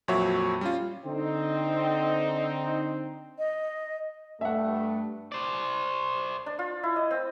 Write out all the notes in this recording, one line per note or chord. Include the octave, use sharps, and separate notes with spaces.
F2 A#2 F#3 F#4 C#5 E5
G3 C#4 F4
D3 C4 D#4
D#5
G2 A3 E5 F#5
C5 D5
D4
F4
E4
D#5
C4